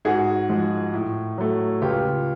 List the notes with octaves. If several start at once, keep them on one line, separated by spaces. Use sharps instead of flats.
G#2 F#4 G#4
F3 G#3
A2
F#3 A3
C#2 F4 G4